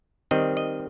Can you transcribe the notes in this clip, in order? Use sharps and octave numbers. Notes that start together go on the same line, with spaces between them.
D#3 G3 C4 D#5
D#5